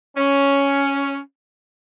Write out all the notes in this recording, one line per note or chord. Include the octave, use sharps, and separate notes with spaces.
C#4